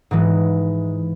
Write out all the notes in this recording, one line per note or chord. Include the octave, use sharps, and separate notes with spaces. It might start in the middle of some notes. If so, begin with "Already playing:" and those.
G#2 E3 G#3